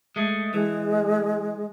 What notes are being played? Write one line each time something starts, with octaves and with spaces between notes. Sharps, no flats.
G#3 A3
E3 G#3